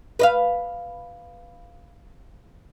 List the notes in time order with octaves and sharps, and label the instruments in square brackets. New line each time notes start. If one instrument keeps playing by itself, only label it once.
[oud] B4 D#5 F5